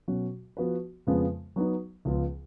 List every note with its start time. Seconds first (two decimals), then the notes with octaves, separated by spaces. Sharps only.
0.08 B2 F#3 C#4 F#4
0.57 F3 B3 F#4 B4
1.07 F2 C#3 F3 G#3 B3
1.56 F#3 B3 D#4
2.05 C#2 C#3 F3 B3 F4